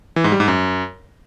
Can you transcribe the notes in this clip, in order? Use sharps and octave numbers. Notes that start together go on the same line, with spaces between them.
E3
G#2
G3
G#2
F#2